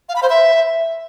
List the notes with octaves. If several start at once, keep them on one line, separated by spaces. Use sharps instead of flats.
F5
B5
C5
E5